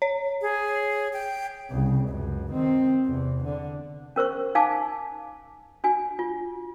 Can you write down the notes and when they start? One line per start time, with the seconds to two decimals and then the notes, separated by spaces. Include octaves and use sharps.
0.02 C#5
0.42 G#4
1.13 G5
1.70 C2 C#3
2.09 C#2 F#2
2.51 D#3 C4
3.04 E2 C3
3.44 D3
4.16 C#4 A#4 C5 C#6
4.55 D#4 F5 G#5 A5 D6
5.84 D4 F#4 G#5
6.19 F4